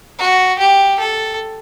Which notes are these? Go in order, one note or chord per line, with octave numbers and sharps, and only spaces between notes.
F#4
G4
A4